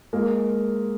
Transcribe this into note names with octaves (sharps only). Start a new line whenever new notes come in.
G#3 A#3